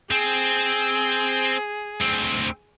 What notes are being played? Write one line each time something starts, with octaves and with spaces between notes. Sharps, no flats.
C4 G#4
D2 C4